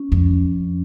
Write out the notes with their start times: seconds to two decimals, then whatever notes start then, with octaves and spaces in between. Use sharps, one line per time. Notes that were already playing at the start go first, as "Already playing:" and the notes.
Already playing: C#4
0.12 F2